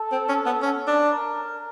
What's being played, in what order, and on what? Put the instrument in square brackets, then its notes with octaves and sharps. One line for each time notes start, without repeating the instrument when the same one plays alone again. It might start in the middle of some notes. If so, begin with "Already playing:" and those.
Already playing: [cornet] A4
[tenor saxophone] C4
C#4
B3
C#4
D4
[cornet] A#4